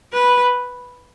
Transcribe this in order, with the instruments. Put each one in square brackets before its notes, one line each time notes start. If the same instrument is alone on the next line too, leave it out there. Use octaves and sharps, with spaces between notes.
[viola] B4